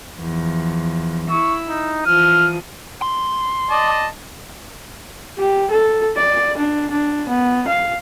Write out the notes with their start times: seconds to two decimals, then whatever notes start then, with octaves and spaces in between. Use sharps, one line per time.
0.18 E2 F3
1.30 E4 C#6 E6
1.69 D#4
2.06 E3 F3 D#6 F6
3.02 C6
3.70 D5 D#5 A5
5.39 G4
5.71 A4
6.17 D5
6.58 D4
6.91 D4
7.29 B3
7.68 F5